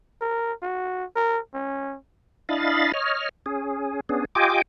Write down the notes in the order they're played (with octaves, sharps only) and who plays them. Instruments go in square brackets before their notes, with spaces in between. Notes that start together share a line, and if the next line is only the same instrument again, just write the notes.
[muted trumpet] A#4
F#4
A#4
C#4
[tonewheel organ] D4 E4 D#5 F5 B5 A6
C#5 D#5 F6
C#4 G#4
B3 C#4 D4 G#4
F4 G4 D#5 G5 G#5 D6